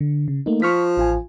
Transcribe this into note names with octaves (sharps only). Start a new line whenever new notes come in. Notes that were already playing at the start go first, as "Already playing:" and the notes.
D3
C#3
A3 A#3 D#4
F3 C#6 F6 B6
A1 F4 G#5